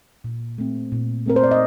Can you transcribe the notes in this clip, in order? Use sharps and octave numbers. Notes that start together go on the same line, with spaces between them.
A#2
A3 C4
A#2
A3 C4 A#4
C5
D5
D#5